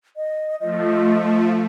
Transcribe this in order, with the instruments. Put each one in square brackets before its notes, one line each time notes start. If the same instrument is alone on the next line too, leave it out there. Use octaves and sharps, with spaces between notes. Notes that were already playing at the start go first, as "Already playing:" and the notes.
[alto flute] D#5
[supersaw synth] F3 A3 [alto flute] D#5